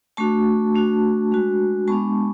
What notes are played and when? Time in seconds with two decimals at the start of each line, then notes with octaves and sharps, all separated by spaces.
0.17 A3 D4 F#4 A5 C#6
0.75 A3 D4 F#4
1.31 G#3 D4 F#4
1.88 G#3 B3 D4 A5 C#6